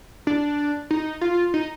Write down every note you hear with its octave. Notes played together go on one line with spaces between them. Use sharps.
D4
D#4
F4
D#4